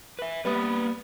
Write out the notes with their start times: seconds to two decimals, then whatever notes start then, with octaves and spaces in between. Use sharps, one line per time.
0.19 B4 E5
0.45 G3 A#3 B3 B4